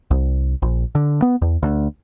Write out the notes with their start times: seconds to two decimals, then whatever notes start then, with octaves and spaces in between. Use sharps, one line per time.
0.11 C2
0.62 A#1
0.95 D3
1.22 B3
1.42 E2
1.63 D2